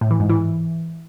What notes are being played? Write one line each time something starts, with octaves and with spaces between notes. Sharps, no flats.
A2
E3
G#2
E3